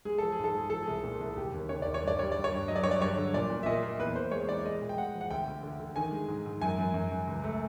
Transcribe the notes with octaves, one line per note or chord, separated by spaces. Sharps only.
G#3 G#4
F3 A4
G#4
G#2
A4
G#3 G#4
F3 A4
C2 G#4
A#2
C2
D#2 G4
D#2
C#3 C#5
D#2 D5
C#5
G2 D5
G3 C#5
G3 D5
C#5
G2
F#3 D#5
D5
G2 C#5
D5
G2 C#5
D3
A#2 D5
A#2
E5
A#2 D#5
A#3
E2 B4
E2 C5
G#3 C#5
E3 D5
G#3 D#5
A#2
G5
G#3 F#5
F3
F#5
D2 G5
D2
D3
D3
D#3 G#5
G#3
G#2
G#2
F#2 G#5
F#2
F#2
F#2
C#2
A3